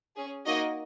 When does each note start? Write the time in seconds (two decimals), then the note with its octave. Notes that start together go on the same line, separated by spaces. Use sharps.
0.16 C#4 G#4
0.45 A#3 D#4 F#4 D#5